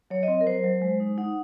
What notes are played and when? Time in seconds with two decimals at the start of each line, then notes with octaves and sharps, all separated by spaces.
0.10 F#3 C#5
0.23 D#5
0.28 C4
0.41 A#4
0.46 F#3 C5
0.64 F#3
0.82 G#3
1.00 D#4
1.18 D#4 F#5